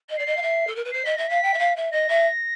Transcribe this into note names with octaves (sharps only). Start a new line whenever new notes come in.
D#5
D5 C7
D#5
F5
E5
A4
A#4
B4
C5 C7
D#5 B6
E5 A#6
F5 B6
G5
E5
F5
E5
D#5 A#6
E5